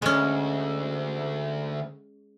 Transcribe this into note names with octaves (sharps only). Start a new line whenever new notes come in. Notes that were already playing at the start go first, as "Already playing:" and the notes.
D2 G#3 C#4